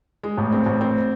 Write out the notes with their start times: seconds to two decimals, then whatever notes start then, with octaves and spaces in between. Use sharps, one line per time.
0.23 G#3
0.37 A1
0.52 C4
0.66 A1
0.81 C4